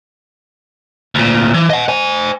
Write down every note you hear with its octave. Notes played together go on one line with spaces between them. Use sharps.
D2 A#2
E3
D#5 F#5
C5 G#5